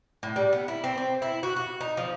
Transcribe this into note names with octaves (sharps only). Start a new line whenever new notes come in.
A2
G3
B3
E4
C4
C4
E4
F#4
F#4
D#4
F3